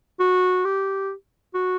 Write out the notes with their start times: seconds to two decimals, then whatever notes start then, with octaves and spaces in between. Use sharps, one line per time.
0.20 F#4
0.65 G4
1.54 F#4